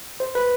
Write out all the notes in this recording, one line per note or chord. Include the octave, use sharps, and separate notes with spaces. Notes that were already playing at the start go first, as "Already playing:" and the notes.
C5
B4